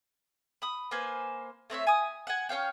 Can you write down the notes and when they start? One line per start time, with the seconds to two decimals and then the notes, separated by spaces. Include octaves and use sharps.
0.62 B5 D#6
0.91 A#3 B4 C5 G#5
1.70 A3 C4 C#5 E5
1.87 G#5 D#6
2.27 F#5 G#5
2.49 C#4 C#5 F5 G5